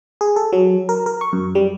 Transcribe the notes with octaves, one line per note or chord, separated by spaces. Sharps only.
G#4
A4
F#3
A#4
A#4
C#6
F#2
G3